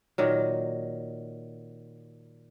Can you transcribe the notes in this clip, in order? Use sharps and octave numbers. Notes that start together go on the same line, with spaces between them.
A#2 D#3 F#3